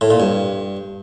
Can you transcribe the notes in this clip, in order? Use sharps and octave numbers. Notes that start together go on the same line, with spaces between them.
A2
A#2
G2